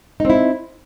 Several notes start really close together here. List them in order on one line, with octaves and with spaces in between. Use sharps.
D#4 C4 E4